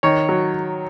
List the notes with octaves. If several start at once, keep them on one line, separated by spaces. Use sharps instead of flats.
D#3 C#5
F#3